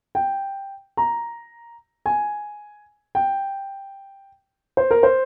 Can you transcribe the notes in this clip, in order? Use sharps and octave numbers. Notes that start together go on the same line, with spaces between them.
G5
A#5
G#5
G5
C5
A#4
C5